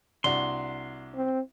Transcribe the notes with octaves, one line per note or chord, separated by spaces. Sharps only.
C2 D4 F#4 C6
C4